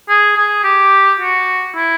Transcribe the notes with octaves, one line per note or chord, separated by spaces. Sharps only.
G#4
G#4
G4
F#4
E4